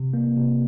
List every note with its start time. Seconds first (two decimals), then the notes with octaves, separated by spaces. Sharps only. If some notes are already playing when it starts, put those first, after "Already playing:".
Already playing: C3
0.13 A#3
0.37 C3